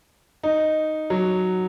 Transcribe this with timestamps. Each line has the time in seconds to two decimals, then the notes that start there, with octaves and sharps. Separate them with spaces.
0.43 D#4
1.10 F#3